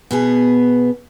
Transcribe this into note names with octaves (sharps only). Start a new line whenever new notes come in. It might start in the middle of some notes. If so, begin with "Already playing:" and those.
B2 B3 G#4